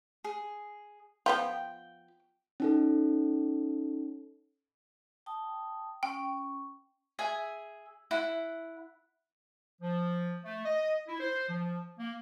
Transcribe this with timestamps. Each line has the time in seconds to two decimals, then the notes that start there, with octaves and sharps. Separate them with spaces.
0.24 G#4
1.26 F3 B3 F4 G5
2.60 C#4 D#4 A4
5.26 G5 A5 D#6
6.03 C#4 G5 C#6
7.19 G#4 E5 G#5
8.11 E4 F#5
9.82 F3
10.45 A3
10.65 D#5
11.08 E4
11.20 C5
11.49 F3
11.99 A#3